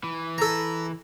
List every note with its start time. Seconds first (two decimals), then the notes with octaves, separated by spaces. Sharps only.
0.03 E3
0.38 A4 A#5